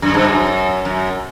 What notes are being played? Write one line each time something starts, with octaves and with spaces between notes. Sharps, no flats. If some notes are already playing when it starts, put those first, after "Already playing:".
F#2
G2
F#2
F#2